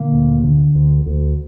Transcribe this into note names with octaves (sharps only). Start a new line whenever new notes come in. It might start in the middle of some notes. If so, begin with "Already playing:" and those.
Already playing: A#2 D3 A#3
D2
D3
D2
D2